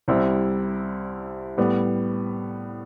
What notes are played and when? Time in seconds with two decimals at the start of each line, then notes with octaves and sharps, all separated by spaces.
0.08 C2 C3 G3 C4 E4
1.57 A2 G3 B3